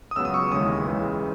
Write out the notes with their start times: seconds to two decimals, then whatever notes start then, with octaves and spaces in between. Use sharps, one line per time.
0.11 D#6
0.16 C#2 C#3 F#3 B3 E6
0.25 D#6
0.34 C#6
0.51 D#2 C#3 E3 G#3 C#4 D#6
0.86 C#2 C#3 E3 G#3